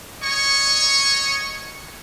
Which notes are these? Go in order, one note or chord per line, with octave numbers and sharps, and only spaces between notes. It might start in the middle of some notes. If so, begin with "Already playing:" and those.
C#5 D#5 C#6